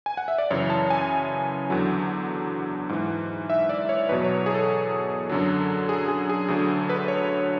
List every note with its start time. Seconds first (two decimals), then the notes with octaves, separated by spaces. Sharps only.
0.06 G#5
0.17 F#5
0.28 E5
0.38 D5
0.51 F#2 C#3 E3 C#5
0.70 A5
0.90 G#5
1.70 E2 D3 F#3
2.89 G#2 E3
3.50 E5
3.69 D5
3.89 C#5
4.09 E2 B2 F#3 B4
4.24 C#5
4.46 G#4
4.54 A4
5.29 F#2 D3 F#3
5.89 G#4
6.08 G#4
6.29 G#4
6.48 D2 D3 F#3 G#4
6.89 B4
7.08 C#5